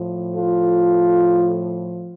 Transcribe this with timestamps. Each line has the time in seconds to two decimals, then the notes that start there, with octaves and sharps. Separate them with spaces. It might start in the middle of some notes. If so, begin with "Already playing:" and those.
Already playing: A2 F3
0.35 F4 A4